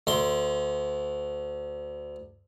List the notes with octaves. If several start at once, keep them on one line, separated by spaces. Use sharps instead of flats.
D2 C6